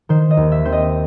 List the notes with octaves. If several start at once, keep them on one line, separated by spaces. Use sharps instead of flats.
D#3 C5
D#5
D#2
E5
C4 C5
D#5